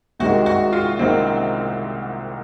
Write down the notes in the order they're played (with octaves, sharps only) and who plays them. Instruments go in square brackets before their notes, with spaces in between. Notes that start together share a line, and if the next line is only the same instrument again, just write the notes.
[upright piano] C2 C3 D#3 G#3 [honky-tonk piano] F#4
[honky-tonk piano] F#4
F4
[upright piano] C2 C3 D#3 G#3 [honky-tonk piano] C4